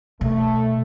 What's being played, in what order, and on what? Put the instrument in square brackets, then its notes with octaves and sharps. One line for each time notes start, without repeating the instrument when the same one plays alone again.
[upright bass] B2 [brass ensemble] A3